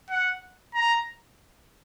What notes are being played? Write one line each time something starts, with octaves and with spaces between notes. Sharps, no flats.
F#5
A#5